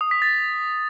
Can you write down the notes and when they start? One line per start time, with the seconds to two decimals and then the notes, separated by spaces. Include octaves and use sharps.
0.01 D#6
0.11 B6
0.22 A6